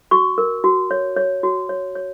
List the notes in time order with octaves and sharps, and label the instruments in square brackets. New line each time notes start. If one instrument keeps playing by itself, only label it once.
[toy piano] F#4 C#6
A#4
F#4
C#5
C#5
F#4
C#5
C#5